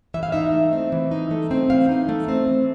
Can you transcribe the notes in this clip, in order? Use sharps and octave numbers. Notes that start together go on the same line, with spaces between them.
E3 E5
F5
D#4 E5
A3
C4
E3
D#4
A3
C4
E3 F5
D#4
A3
C4
E3